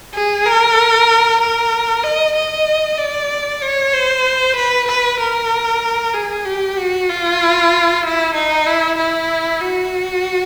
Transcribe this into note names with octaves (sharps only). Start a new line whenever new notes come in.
G#4
A#4
A#4
D#5
D#5
D5
C#5
C5
B4
B4
A#4
G#4
G4
F#4
F4
E4
D#4
E4
E4
F#4